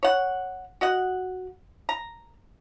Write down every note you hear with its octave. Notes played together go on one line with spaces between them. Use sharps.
C#5 F#5
F#4 D#5 F#5
A#5